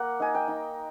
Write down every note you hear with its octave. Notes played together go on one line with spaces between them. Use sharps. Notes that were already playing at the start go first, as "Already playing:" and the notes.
Already playing: A#3 F#5
D#4 G#5
G5
D#4